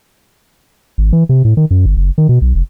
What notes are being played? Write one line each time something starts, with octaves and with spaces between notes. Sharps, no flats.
G#1
E3
C3
A2
D#3
F#2
G1
F#1
D#3
B2
B1
F1